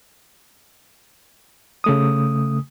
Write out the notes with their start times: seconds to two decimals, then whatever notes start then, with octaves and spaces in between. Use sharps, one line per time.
1.84 C#3 A3 D#6